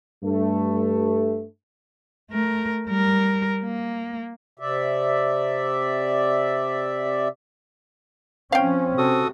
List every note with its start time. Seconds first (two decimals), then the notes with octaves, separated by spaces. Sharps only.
0.23 G2 A3
2.31 A3 A#4
2.88 G3 A#4
3.64 A#3
4.59 C3 D5 E5
8.52 F3 C4 C#4 F5 G5
8.98 C3 F#4 A4 D#6